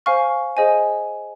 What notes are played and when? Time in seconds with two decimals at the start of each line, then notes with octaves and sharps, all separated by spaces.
0.06 C5 F5 G#5 C#6 F6
0.57 G#4 C5 D#5 G#5